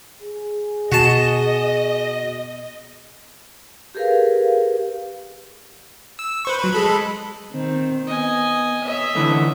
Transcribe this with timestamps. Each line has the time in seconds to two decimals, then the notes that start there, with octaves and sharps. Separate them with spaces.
0.22 G#4
0.92 B2 F#4 D#5 A5
3.95 G4 G#4 A#4 B4 F5
6.19 E6
6.45 B4 C5 C#6
6.59 F#3 B4
6.73 G#3 A4 B5
7.52 D#3 C4
8.07 B3 D#5 G#5
8.84 C#5 D#5 E5
9.15 D3 E3 A3